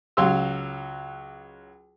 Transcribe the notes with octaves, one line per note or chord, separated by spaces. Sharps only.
C#2 F#3 F5 C6 E6